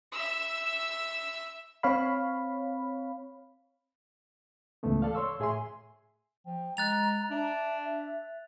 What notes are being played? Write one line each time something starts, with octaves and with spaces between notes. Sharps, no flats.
E5 E6
C4 C#5 F5 B5
C#2 G#2 E3 A3 B3
A4 D5 F5
C#5 C6 C#6 E6
A2 G#4 E5 G#5 C6
F3 G5
G#3 A#5 F#6 A6 F7
D4 E5